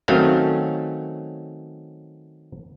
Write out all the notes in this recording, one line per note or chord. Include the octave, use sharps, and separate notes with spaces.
D#3 F#3 A3 C4 C#4 F5